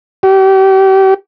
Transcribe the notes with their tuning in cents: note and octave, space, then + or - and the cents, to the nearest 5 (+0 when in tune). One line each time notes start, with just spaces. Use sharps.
G4 -35